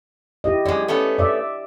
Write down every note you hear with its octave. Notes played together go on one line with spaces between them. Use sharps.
E4 G4 D#5
F#2 G#3 D5
A3 B3 C#4
D5 E5